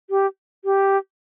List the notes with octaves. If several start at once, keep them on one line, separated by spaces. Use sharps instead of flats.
G4
G4